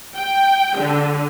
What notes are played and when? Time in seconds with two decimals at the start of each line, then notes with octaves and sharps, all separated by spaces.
0.15 G5
0.78 D3